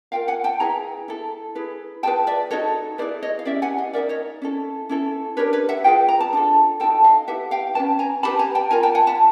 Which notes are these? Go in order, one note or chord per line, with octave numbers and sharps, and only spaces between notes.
F4 A#4 F5 G5
F#5 G#5
G5 A5
E4 G#4 B4 G#5 A#5
E4 A4
E4 G#4 B4
F4 G#4 B4 G5 A5
D5 E5
D#4 F#4 A4 C#5 D#5
E4 G#4 B4 C5 D5
C#5 D#5
F5
C#4 E4 G4 D5 E5
F#5 G#5
D#5 F5
D#4 G4 A#4 D5 E5
C#5 D#5
C#4 E4 A4
C#4 E4 A4
D4 G4 A#4 B4 C#5
B4 C#5
E5 F#5
F4 G#4 B4 F5 G5
A#5
A5
D4 F4 A4
D#4 F#4 A4 G5 A5
D#5 F5
E4 G4 B4 E5 F#5
F5 G5
C#4 F#4 B4 G5 A5
G#5 A#5
D#4 G4 B4 A5 B5
G#5 A#5
G5 A5
F4 A#4 G#5 A#5
G5 A5
F#5 G#5
A5 B5